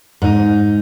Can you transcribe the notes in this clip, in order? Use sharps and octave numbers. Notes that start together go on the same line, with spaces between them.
G#2 D#4